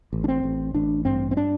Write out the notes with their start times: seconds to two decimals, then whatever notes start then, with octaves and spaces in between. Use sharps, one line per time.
0.13 A1
0.24 D4
0.28 C4
0.44 A1
0.74 A1 D4
1.05 G2 C4
1.31 C4
1.37 D4